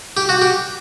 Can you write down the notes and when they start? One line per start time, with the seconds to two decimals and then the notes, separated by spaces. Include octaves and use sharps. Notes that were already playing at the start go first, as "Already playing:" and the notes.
0.17 G4
0.29 F#4
0.42 G4